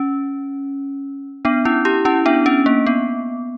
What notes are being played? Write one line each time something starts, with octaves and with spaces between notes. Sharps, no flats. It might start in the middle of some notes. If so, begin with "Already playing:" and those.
Already playing: C#4
B3 D4
C#4 E4
E4 G4
C#4 E4
B3 D4
C#4
A#3
B3